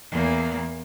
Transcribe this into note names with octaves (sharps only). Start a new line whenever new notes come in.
E2 A#3